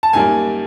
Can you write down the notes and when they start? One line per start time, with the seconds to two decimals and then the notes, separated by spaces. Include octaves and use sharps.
0.03 A5
0.13 F#2 D#3 G3 A#3 G#5